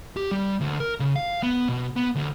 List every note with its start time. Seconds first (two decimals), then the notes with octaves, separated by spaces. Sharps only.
0.17 G4
0.31 G3
0.61 D2
0.80 A#4
1.00 C#3
1.16 F5
1.43 B3
1.68 B2
1.96 B3
2.15 D2